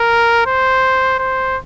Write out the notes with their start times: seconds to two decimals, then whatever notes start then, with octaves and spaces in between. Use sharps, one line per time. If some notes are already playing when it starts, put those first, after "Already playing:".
Already playing: A#4
0.47 C5
1.19 C5